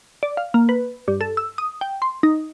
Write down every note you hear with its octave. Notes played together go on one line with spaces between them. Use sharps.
D5
F5
A#3
B4
G2
A4
E6
D#6
G5
C6
D#4